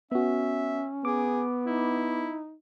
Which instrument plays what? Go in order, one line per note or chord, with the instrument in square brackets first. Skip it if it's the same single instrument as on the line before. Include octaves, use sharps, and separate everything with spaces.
[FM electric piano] B3 F#4 [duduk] C#4 [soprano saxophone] E5
[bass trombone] B3 [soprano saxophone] G#4 [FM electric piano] D6
[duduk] D#4 [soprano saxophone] E4